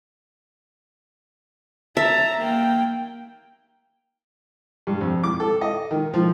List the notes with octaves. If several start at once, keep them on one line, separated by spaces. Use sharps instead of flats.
E5 A5 A#5
A#3 G5
G2
F2
D6
A4
D#5
D#3
F3